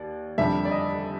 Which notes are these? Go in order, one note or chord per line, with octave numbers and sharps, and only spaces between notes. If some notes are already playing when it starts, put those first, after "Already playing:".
Already playing: D#2 D5
F1 F2 D3 G3 E5
D5
D#5